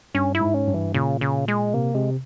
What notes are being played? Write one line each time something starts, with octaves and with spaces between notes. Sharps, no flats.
G2 C#4
E4
G#2
C#4
G2
E3
A#2 C#3
C#3
G#3
C3 A#3
C3 G#3